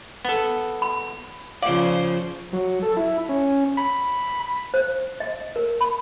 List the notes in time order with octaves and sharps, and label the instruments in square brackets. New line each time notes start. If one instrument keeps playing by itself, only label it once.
[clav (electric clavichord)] B3 A4
[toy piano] B5
[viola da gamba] C#3 F3 C5 [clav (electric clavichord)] D5 [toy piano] F5
[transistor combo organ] F#3
A4
E4
C#4
B5
[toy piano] C5
D#5
A#4
B5